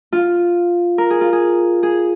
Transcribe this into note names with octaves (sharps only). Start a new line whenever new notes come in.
F4
A#4
G#4
F4
G#4
G#4